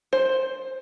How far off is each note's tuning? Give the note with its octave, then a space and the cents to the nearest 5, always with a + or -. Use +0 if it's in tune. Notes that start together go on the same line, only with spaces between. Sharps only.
C5 +10